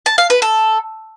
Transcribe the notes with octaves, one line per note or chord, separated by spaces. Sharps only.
A5
F5
B4
A4